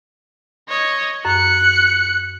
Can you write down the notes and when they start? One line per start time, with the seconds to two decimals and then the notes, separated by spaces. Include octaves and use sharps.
0.68 C#5 D#5
1.25 F#2 F#6 C#7